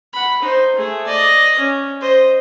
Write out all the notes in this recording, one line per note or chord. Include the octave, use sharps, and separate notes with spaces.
F#5 B5
D#4 C5
A3 G#4
D5 D#5
C#4
C5 D#5